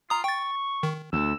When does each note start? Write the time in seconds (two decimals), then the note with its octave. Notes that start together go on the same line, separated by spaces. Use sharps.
0.10 F4 A#5 D#6
0.24 G5 C#6 A6
0.83 D#3
1.13 D2 E6